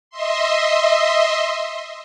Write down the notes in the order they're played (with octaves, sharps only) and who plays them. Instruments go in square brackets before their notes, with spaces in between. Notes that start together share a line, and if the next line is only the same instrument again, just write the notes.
[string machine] D#5 E5 C6